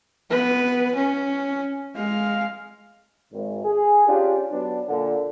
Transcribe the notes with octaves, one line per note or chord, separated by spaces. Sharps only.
B3 B4
C#4
G#3 F5
G#1
G#4
C#4 D4 F4 G4
F#3 B3 D4
A#2 D3